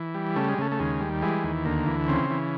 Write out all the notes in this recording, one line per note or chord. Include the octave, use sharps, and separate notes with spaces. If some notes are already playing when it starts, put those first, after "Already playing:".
Already playing: E3
G3
C#3 A3
G#3
C#3 A3
A3
D#2 G#3
G3
E3 G#3
D#2
D2 A#3
E3
C#3 C4
E3